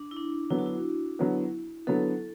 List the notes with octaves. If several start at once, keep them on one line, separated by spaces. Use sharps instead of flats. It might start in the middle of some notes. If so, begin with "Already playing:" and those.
Already playing: D4
E4
D4
D3 F#3 B3 E4
F#4
E4
D3 F#3 B3
D3 F#3 B3 A4